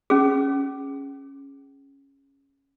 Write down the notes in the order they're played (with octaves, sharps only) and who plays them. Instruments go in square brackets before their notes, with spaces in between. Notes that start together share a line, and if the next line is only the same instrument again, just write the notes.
[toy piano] C#4 G#4